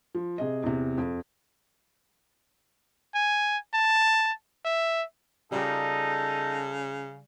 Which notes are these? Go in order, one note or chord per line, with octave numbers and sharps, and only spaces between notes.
F3
C3 G#4 D#5
E2 C3
F2
G#5
A5
E5
C#3 G3 D#4 F4 G4 A4